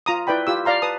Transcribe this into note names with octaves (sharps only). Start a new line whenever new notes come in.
F4 A#5 D#6
E4 B4 D5 G5 B5
F4 G4 E6
D5 F5 A#5 C6
B4 A5 D#6